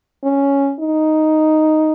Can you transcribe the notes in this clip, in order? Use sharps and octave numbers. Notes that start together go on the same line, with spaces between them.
C#4
D#4